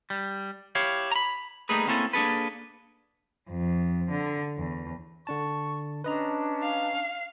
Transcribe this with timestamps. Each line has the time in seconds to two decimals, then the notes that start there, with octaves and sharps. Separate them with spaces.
0.10 G3
0.75 E4 G4 C#5 F5
1.11 A#5 B5
1.69 G3 A3 A#3 D#4 G#4 B4
1.87 A#3 C4 C#4 E4 A4
2.13 A#3 D4 G#4 A4 B4
3.49 F2
4.11 D3
4.58 E2
5.27 D3 D4 A5 C#6
6.04 C#4 D4 B4 D#5 A5 A#5
6.63 F5